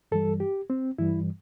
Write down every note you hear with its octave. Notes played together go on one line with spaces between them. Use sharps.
G2 E3 G3 A4
G4
C4
G2 E3 G3 E4